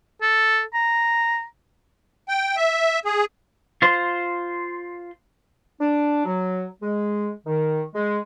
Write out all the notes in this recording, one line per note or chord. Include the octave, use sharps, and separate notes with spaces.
A4
A#5
G5
E5
G#4
F4 C5
D4
F#3
G#3
D#3
G#3